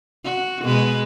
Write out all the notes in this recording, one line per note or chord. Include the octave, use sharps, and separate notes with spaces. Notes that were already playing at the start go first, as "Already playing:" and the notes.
F#4
B2 G#3 B4